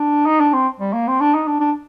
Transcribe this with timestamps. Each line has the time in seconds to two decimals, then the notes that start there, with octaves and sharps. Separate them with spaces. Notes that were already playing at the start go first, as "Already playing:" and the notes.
Already playing: D4
0.26 D#4
0.40 D4
0.53 C4
0.80 G3
0.93 A#3
1.08 C4
1.20 D4
1.34 D#4
1.47 D4
1.61 D4